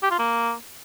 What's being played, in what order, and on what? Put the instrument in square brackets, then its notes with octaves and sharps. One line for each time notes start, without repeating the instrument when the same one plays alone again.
[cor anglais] G4
F4
A#3